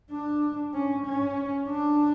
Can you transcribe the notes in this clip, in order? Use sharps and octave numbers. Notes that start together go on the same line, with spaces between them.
D4
C#4
C#4
D4